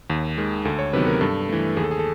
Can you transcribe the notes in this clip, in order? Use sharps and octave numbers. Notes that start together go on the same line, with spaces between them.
D#2
D#3 G#3
D2 A4
C#5
C3 D#3 F#3 B3 B4
A#4
G2 A4
E3 A3
D#2 G#4
A4
G#4
A4